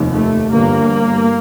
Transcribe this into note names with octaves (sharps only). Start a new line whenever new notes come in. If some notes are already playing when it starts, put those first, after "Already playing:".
Already playing: F1 D#2
A3
G1 G2 A#3